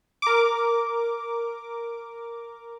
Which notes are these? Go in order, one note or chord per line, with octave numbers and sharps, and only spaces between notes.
A#4 D6